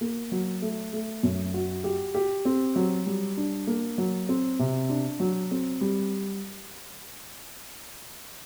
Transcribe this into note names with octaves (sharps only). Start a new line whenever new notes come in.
A#3
F#3
A3
A3
F#2
F#4
G4
G4
C4
F#3
G3
D4
A#3
F#3
C4
C3
D4
F#3
C4
G3